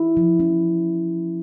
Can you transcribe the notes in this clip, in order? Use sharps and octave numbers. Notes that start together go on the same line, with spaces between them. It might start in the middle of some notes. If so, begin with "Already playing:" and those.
Already playing: E4
F3
C#4